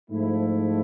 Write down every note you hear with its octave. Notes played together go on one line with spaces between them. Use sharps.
G#2 F3 A3 E4